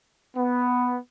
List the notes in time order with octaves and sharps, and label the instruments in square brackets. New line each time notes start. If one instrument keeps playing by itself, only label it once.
[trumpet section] B3